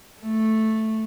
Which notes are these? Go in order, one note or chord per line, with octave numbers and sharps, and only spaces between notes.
A3